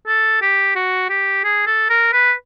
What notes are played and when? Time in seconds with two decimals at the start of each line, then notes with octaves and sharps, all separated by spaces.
0.07 A4
0.42 G4
0.76 F#4
1.10 G4
1.44 G#4
1.67 A4
1.90 A#4
2.13 B4